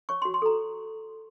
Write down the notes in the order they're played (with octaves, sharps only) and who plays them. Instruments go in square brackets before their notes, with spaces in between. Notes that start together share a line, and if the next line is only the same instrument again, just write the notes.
[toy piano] C#5 C#6
C6
F#4
C6
A4 A#5